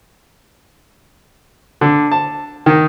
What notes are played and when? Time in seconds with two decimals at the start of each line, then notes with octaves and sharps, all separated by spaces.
1.81 D3
2.12 A5
2.66 D#3